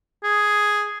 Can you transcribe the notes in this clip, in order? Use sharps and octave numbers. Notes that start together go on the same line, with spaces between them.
G#4